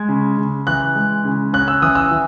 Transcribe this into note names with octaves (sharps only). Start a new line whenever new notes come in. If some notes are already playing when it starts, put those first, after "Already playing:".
Already playing: G#3 G#6
C#3
C#3
E3 F#6
G#3
C#3
C#4 F#6
E6
E3 D#6
E6
E3